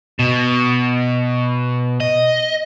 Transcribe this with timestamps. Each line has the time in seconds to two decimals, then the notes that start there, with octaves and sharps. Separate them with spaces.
0.19 B2
2.00 D#5